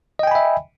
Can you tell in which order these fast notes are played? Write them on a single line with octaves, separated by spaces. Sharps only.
D#5 G5 G#5 B5 E5